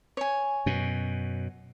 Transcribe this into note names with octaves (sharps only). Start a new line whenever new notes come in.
C#5 G#5
F#2 B2